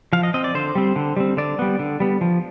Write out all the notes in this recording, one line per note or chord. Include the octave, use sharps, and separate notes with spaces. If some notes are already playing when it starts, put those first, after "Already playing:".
F3 F5
D#5
C4 D#5
D5
D3 C5
G3 C4
D3
G3 C4
D3 D5
G3 B3
D3
G3 B3
F3